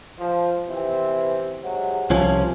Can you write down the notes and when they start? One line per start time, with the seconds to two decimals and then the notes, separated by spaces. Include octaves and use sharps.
0.18 F3
0.68 C3 E3 C4
1.62 G#2 C3 F#3
2.10 C2 F#2 C3 F3 C#4